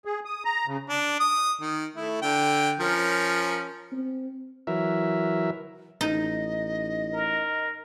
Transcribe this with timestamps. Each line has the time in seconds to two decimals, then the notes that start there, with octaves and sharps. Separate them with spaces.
0.05 G#4
0.25 D#6
0.45 A#5
0.67 C#3
0.89 D4
1.20 D#6
1.61 D#3
1.96 A3 E4
2.22 D3 G5
2.80 F3 C#4 A#4
3.92 C4
4.67 E3 F#3 A#4 E5
6.01 A1 D#4 D#5
7.13 A#4